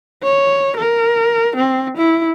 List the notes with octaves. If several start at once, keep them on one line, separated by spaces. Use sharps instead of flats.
C#5
A#4
C4
E4